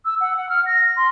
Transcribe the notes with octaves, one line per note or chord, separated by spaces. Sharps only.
E6
F#5
F#5
F6
A#6
C6